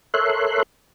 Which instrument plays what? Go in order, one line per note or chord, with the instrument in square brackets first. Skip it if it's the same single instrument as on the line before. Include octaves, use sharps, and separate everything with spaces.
[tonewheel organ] A4 A#4 C#5 E5 C6 F#6